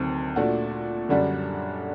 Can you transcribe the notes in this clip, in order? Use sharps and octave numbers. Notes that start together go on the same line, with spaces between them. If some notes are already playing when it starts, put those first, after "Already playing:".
Already playing: D2 C3 D#3 F#3 C4
A#2 A3 D4 F#4
F#2 D3 G3 D4 F#4